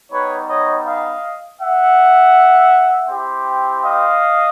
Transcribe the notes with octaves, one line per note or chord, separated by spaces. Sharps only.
G3 B3 D#4 B4 C#5
C#5 D#5
D#5 F5
E5 F#5
C4 E4 G4
D#5 F5